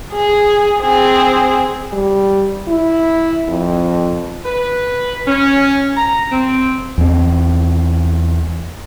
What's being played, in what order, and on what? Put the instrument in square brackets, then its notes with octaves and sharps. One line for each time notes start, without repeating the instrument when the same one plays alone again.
[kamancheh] G#4
C4 G#4
[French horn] G3
E4
F2
[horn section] B4
C#4
A#5
C4
[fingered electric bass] E2 C4